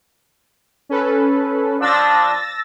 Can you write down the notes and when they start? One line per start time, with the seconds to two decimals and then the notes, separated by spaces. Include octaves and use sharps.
0.89 C#4 A4 B4
1.81 F3 D4 E6 A6 A#6